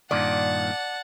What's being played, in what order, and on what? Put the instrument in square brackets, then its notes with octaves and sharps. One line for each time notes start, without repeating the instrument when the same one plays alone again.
[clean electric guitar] G2 A#2 D#3 [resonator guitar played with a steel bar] D5 [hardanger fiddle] F#5 A5